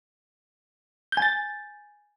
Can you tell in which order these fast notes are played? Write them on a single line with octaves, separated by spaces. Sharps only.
G6 G#5 A6